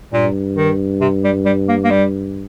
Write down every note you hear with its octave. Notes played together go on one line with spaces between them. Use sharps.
G2 A#2
D#3
C3
G3
G3
A#3
A#3
G3